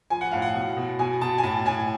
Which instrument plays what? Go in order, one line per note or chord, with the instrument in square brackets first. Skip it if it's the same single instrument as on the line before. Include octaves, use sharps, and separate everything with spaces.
[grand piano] F3 G#5
F#5
A2 F5
F#5
B2
B2
B2 G#5
B2 A5
G#5
A2 A5
A2 G#5